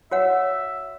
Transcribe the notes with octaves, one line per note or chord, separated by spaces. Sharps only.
F#4 C#5 E5 F#5